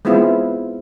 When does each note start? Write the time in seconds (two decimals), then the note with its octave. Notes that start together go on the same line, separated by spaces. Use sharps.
0.05 G#3 B3 C4 E4 F4